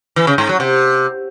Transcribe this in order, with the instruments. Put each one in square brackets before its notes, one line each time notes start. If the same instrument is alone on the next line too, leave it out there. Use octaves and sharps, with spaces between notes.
[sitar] E3
C#3
G#2
F#3
C3